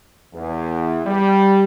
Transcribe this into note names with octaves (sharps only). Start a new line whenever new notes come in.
E2
G3